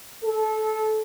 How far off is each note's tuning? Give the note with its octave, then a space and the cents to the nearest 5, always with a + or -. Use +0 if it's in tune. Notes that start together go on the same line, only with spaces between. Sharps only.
A4 -20